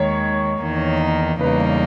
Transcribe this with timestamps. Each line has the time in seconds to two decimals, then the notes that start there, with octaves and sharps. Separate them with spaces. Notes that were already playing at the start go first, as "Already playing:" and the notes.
Already playing: D#2 D#3 G#3 C#5
0.62 E2 D#3 A#3 D#4
1.41 E2 C#3 G3 A#3 D#4 B4